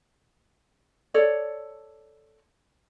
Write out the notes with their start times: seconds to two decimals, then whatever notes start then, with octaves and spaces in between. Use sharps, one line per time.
1.14 A4 C#5 D5